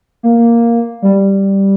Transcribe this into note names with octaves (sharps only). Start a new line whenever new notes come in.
A#3
G3